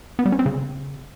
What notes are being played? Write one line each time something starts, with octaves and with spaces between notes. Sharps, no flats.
B3
G3
C#4
C4
C#3